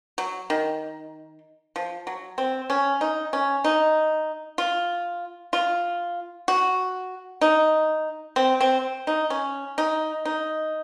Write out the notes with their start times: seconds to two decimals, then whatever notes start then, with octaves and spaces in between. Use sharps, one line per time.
0.18 F#3
0.50 D#3
1.76 F3
2.07 F#3
2.38 C4
2.70 C#4
3.01 D#4
3.33 C#4
3.64 D#4
4.58 F4
5.53 F4
6.48 F#4
7.41 D#4
8.36 C4
8.61 C4
9.07 D#4
9.30 C#4
9.78 D#4
10.25 D#4